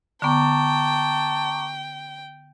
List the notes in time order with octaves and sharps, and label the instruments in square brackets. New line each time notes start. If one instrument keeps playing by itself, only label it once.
[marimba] D3 B3 [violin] G5 [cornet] A5 [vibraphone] A#5 C#6 D6